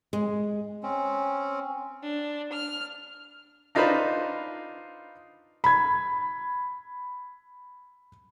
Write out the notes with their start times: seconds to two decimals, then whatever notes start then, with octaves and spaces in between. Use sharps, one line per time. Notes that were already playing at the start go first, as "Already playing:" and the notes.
0.13 G#3
0.83 C4 C#4
2.03 D4
2.53 F6
3.75 D4 D#4 F4 B4 C5 B5
5.64 B5 G#6